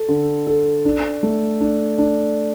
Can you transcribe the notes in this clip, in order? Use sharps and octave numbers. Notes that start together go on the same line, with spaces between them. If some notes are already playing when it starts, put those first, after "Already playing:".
Already playing: A4
D3
A4
D4
A3
D4
D4